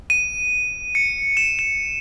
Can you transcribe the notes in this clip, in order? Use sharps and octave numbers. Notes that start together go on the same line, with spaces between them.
D#7
C#7
E7
E7